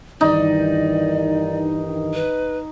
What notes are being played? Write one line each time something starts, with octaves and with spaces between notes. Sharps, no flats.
G2 D#3 E3 D#4 D5
B4